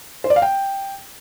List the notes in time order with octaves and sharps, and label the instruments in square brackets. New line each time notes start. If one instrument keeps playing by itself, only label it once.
[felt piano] C5
D5
F5
G5